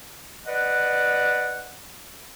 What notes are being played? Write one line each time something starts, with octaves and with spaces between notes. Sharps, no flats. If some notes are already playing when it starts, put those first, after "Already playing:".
B4 D5 D#5 F#5